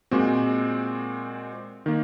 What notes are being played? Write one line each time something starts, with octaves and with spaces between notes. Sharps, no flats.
A#2 G#3 C4 F#4
D#3 A#3